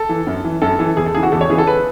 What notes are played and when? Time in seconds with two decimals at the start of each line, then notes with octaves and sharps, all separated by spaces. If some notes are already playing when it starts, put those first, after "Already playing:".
Already playing: A4
0.09 E3
0.27 F#2
0.44 E3
0.62 F#2 A4
0.79 E3 A4
0.97 E2 G#4
1.06 A4
1.14 C#3 E3 G#4
1.23 F#4
1.32 E2 A4
1.41 C#5
1.50 C#3 E3 G#4
1.58 A4
1.67 B4